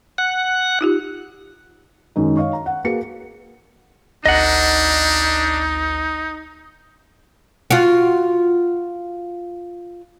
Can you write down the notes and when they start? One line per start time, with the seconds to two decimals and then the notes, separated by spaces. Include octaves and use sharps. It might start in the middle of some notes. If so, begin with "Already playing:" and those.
0.18 F#5
0.81 D#4 F4 G4
2.16 F#2 D#3 G#3 D#4
2.37 C#5 D#5 F5 C#6
2.53 A#5
2.66 F#5
2.84 A#3 F#4 G#4 B4 C#7
4.26 G#1 D2 D4 D#4 D#5 F#5 A#5
7.70 F4 F#4